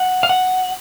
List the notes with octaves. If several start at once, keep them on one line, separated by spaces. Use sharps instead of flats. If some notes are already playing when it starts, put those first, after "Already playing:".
Already playing: F#5
F5
F#5